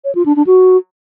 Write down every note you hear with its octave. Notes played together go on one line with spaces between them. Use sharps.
C#5
F4
D4
D4
F#4